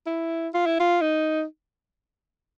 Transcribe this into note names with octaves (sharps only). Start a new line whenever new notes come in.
E4
F4
E4
F4
D#4